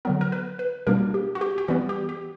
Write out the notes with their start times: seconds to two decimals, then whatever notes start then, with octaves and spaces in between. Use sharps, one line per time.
0.05 D3 F#3 B3 A#4
0.21 A#4
0.32 B4
0.59 B4
0.87 B2 G3 A#3 D4 A#4
1.14 G4
1.35 F#4
1.41 G4
1.58 G4
1.68 E3 G3 B3 F#4
1.89 G4
2.09 G4